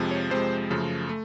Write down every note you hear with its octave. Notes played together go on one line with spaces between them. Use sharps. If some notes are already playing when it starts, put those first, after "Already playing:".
Already playing: F2 C3 F3 G#3
C#5
F2 C3 F3 G#3 C5
F#2 C#3 F3 A3
A3